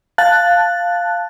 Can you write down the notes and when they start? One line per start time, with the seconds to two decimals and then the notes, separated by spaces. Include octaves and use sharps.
0.18 F5 A5 F#6 A6